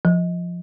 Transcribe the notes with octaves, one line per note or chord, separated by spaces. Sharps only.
F3